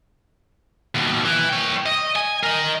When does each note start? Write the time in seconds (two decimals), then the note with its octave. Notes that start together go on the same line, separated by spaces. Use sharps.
0.95 D#2 B2
1.25 E3
1.49 C#5 G5
1.86 D#5
2.16 G#5
2.43 A#4 D#5